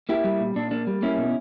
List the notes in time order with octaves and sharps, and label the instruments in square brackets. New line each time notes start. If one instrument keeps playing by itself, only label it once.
[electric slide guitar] A#3 E4 G4
G3
A#2
A#2 D4
A#3 D4
G3
A#3 C#4 E4
B2